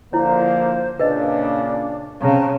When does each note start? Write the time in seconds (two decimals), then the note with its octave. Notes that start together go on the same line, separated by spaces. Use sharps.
0.13 D3 F3 A#3 E4 C5 C#5
1.00 A#2 C#3 D4 B4 D#5
2.21 C#3 C4 F5 A5 A#5